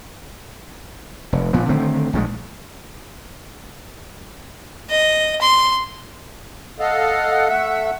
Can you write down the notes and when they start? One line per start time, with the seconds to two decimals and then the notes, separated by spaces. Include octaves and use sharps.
1.33 F1
1.53 A#2 F3 B3
1.69 D3 D#3 A3 C4
2.13 A#1 A2 D#3 G#3
4.90 D#5
5.42 C6
6.79 A4 D#5 F5 F#5
7.48 A3 E5